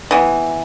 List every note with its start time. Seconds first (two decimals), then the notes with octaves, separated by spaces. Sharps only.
0.11 E3 B3